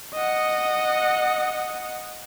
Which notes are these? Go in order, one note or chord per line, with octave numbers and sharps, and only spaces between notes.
D#5 F#5